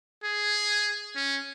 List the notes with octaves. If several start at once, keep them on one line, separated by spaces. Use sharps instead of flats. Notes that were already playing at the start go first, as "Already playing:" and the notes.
G#4
C#4